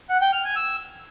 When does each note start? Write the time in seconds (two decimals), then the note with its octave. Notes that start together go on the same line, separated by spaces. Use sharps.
0.09 F#5
0.21 G5
0.33 F6
0.44 G#5
0.56 E6